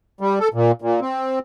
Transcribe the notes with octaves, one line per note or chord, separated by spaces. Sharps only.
G3
A4
A#2
A#2
C4